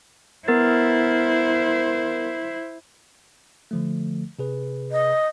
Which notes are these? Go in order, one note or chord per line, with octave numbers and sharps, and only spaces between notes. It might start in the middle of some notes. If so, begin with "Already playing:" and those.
B3 E4 A#4 C5 A6
D3 F3 A3
C3 G#4 B4
D#5